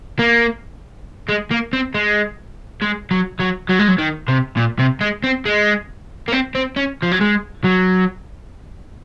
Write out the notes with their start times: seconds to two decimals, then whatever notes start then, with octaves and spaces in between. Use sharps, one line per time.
0.19 A#3
1.29 G#3
1.51 A#3
1.73 C4
1.95 G#3
2.82 G#3
3.11 F#3
3.40 F#3
3.70 F#3
3.79 G#3
3.88 F#3
3.99 D#3
4.28 C3
4.57 A#2
4.79 C3
5.01 G#3
5.24 C4
5.45 G#3
6.28 A#3
6.32 C4
6.55 C4
6.76 C#4
7.02 F3
7.11 F#3
7.20 G#3
7.64 F#3